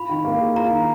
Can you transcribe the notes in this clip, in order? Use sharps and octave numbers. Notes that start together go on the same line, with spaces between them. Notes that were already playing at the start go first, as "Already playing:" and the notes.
Already playing: F4 B5
D#3
A#3
G#4
F4 A#5
D#3